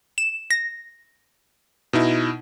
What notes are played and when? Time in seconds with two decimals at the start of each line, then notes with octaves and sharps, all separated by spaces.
0.18 E7
0.51 A#6
1.93 B2 D#4 E4